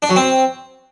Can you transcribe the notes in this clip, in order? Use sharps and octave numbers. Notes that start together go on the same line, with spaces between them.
D4
F#3
C4